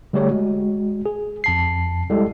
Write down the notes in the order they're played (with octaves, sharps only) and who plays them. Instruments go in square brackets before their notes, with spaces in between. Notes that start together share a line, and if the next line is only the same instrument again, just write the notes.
[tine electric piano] D3 G3 A3 G4 G#4 C#5
G#3 F#4
G#4
F2 A5 C7
G3 G#3 E4 G4 A4